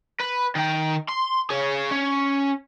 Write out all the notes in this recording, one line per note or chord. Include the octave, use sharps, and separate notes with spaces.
B4
D#3 G5
C6
G#4 C#5
C#4